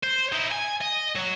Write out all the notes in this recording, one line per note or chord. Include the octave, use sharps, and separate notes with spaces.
C5
D#4 E4
G#5
D#5
F#3